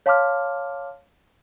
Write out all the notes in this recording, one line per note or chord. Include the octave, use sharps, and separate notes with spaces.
C#5 F5 A5 C6 D6 F6